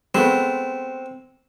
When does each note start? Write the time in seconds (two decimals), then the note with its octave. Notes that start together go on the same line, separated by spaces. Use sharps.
0.15 G#3 A3 B3 C4